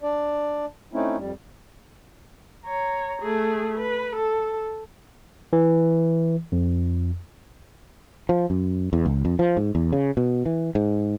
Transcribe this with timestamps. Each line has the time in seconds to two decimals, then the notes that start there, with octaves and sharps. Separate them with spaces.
0.03 D4 D5
0.93 A3 C4 C#4 D#4 E4
1.17 F2 G3
2.65 C#5 A#5
3.22 A3 G#4
3.78 B4
4.16 A4
5.53 E3
6.52 F2
8.29 F3
8.50 F#2
8.93 E2
9.06 C#2
9.25 F2
9.39 F3
9.57 G#2
9.75 E2
9.93 C#3
10.17 B2
10.46 E3
10.75 G#2